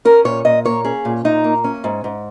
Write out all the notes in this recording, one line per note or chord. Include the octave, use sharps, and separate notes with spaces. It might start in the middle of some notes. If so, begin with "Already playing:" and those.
C#4 A#4
A#2 C#5
A#2 D#5
A#3 C#5
C#4 G#4
A#2
A#2 D#4
A#3
C#4
G#2
G#2